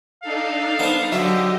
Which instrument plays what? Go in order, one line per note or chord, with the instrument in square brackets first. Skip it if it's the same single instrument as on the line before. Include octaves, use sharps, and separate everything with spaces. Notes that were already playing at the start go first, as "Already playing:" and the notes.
[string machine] D4 D#4 A4 [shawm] F5
[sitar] B3 [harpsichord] C5 A5
[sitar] D3 E5 [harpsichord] F#3 [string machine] G4 D#5